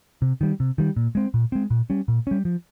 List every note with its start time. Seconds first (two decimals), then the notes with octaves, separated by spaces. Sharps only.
0.22 C3
0.41 D#3 G3
0.60 C3
0.78 D#3 G3
0.97 A#2
1.15 G#3 C4
1.34 A#2
1.52 G#3 C4
1.70 A#2
1.90 G3 C#4
2.08 A#2
2.27 G3 C#4
2.45 F3